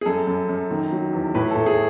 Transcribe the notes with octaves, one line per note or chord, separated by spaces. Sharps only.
G#4
F#2 A4
F#2
F#2
D#3
F#3
E2
A2 B4
A4
A2
G#4